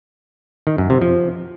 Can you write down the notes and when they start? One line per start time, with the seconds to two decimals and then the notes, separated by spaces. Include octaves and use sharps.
0.67 D#3
0.78 F#2
0.90 C3
1.02 F3